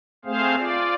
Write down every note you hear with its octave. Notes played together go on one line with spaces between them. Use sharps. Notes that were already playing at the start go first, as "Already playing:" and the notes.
A3 C4 G#4 C5 F5
F4 D5